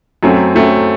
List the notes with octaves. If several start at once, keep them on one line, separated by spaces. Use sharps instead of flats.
F#2 F#3 A3 C4
F#2 F#3 A3 C4